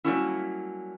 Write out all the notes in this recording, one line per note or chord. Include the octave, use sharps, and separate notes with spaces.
F#3 G3 A3 A#3 C#4 E4